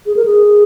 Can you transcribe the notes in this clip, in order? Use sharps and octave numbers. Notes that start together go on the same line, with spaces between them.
G#4
A#4
G#4